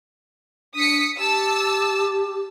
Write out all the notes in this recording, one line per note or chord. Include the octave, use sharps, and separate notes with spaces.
D4 D#6 B6 C#7
G4 A5 E6